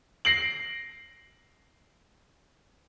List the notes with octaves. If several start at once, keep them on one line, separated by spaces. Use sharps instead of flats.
A#6 C7 D7 F#7